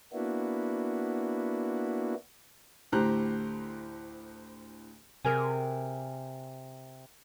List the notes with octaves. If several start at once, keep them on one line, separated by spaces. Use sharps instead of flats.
A#3 B3 D4 E4 F#4
D2 A2 G4 C5 A#5 F#6
C3 G#4 A#4 G#5